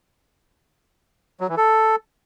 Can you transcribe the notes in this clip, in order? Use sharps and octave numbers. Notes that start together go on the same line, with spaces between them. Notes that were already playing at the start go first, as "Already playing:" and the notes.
F#3
E3
A4